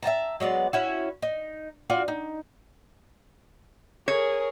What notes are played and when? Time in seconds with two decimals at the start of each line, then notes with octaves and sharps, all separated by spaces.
0.03 E5 G5 A5 A#5
0.40 F#3 G#3 B3 D5
0.73 C#4 E4 F#4
1.22 D#4
1.90 F4 F#4 D5
2.08 D#4
4.08 G#4 A#4 C#5